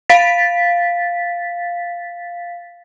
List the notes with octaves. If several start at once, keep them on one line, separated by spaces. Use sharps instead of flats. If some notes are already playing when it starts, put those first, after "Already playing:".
F5 A6 B6